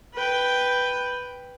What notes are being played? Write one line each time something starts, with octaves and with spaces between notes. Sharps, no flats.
B4 G5